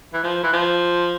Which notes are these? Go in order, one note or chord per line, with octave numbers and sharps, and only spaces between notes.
E3
F3
E3
F3